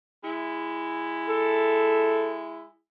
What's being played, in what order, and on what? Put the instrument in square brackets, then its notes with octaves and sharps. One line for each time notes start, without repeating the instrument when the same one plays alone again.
[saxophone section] G#3 E4
[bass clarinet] A4